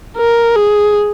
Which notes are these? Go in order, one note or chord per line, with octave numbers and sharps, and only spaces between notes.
A#4
G#4